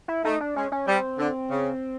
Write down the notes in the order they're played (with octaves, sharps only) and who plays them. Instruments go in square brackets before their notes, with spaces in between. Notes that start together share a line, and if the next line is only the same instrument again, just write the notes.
[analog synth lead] E4
[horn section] A3 [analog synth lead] D#4
[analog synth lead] D4
[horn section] G#3 [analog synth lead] C#4
[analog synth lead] C#4
[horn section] G3 [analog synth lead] C4
[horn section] D3
C#3